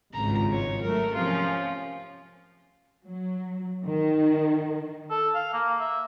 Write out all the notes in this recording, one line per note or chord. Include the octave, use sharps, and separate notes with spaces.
G#1 C#2 G2 A#5
C#5
F#3 A3 A#4
C3 F3 C#4 F4
F#3
D#3
A4
F5
A#3
E5